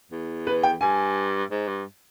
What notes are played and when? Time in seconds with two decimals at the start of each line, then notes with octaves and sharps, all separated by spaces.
0.12 E2
0.47 B4
0.63 G5
0.81 G2 G#5
1.51 G#2
1.68 G2